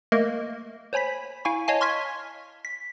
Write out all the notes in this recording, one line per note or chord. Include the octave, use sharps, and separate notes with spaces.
A3 A#3 A#4 D#5
C5 C#5 G#5 B5 B6
E4 F5 G#5 C#6
C#5 D#5 F5 G#5 A5
C6 C#6 F6 G#6 B6
B6